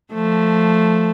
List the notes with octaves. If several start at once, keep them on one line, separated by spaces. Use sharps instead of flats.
F3 A3